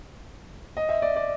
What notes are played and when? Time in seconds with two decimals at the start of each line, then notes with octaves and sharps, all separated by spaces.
0.77 D#5
0.89 E5
1.02 D5
1.16 D5